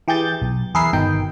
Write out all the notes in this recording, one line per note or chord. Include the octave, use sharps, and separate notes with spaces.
E3 G4 G#4 G6 A6
B1
E2 G#4 A#4 B4 E5 C7
G1 B2 D#3 D#4 G5